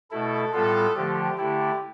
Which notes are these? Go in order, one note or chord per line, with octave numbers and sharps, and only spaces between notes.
B2 A3 E4 A4
A2 G3 B3 F4 A4
D3 F3 A3 G4
D3 A3 E4 G4